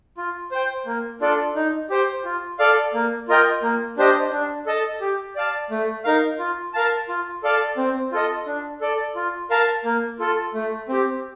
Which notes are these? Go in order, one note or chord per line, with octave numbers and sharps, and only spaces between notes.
F4
C5 G5
A#3
D4 F4 A4 D5
D#4
G4 C5 G5
F4
A4 D5 F5
A#3
F4 A#4 D#5 G5
A#3
D4 G4 C5 D#5
D4
A4 D#5 A5
G4
D5 F5 A5
A3
D#4 A#4 F5
F4
A#4 F5 A5
F4
A4 D5 F5 A5
C4
F4 A4 D#5
D4
A4 D5
F4
A#4 F5 A5
A#3
F4 A4
A3
C4 G4